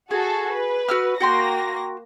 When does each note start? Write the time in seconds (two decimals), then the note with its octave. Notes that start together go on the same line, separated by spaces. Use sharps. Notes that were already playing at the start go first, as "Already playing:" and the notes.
0.11 F#4 G#4 A4
0.53 B4
0.88 F#4 E6 F6
1.20 A#3 F#4 G5 C6 A#6